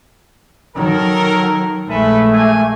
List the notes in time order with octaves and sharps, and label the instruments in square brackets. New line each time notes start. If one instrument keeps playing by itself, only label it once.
[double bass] D#3 F#3 [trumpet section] A4 A#4
[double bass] A#1 G#3 [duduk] A3 [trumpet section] A4 B4 E5
[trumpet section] A#3 G#5